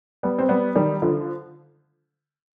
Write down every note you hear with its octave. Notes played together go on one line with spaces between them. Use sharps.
G3 B3
C4
G3 B3
D#3 G3
D3 F3